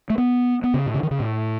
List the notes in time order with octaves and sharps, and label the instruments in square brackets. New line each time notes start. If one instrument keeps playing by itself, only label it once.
[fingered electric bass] A3
B3
B3
C#3
A2
C#3
D#3
C#3
A2